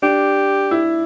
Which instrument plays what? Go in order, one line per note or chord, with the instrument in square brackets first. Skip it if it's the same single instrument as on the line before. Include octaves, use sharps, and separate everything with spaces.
[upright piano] D4 [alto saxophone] G4
[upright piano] E4